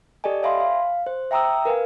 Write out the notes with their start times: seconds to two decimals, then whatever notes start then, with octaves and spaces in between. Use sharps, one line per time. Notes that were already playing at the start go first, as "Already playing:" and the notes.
0.24 G4 A4 D5 D#5 G#5
0.43 C#5 E5 F5 G#5 B5 C6
0.60 F5
1.06 C5
1.31 E5 G5 A#5 D#6 E6
1.65 A#4 B4 F5 G#5